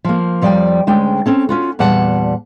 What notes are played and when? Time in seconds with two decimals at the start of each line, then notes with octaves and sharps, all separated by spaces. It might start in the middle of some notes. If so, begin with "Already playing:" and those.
0.04 F3 A#3
0.41 F2 F3 G3 D5 G5
0.87 D2 G#3 C#4 G5
1.26 C4 C#4 A4
1.49 C#4 F4 F#4
1.79 E2 A#2 G3 F#5 A5